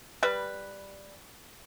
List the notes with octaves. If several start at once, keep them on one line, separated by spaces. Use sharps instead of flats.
G3 B4